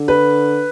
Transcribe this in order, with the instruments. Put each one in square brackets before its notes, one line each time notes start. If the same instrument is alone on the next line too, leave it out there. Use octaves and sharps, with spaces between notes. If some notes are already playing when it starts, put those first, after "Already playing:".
Already playing: [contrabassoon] D3
[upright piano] B4